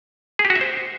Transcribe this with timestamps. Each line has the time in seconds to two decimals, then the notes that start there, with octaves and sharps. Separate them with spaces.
0.39 G#4
0.45 G4
0.50 F#4
0.56 E5
0.61 C5